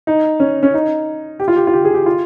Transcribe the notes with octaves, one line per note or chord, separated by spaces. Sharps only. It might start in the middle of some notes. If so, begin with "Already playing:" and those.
D#4
C#4
C#4
D#4
G4
F4
G4
F4
G4
G#4
G4
F4